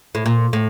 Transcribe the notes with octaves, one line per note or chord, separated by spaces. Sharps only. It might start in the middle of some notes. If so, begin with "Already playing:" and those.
A2
A#2
A2